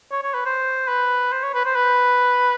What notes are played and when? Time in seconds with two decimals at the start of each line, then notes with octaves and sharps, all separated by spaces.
0.12 C#5
0.23 C#5
0.34 B4
0.46 C5
0.88 B4
1.32 C5
1.43 C#5
1.54 B4
1.65 C5
1.76 B4